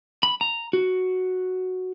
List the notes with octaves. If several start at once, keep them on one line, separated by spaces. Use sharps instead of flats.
B5
A#5
F#4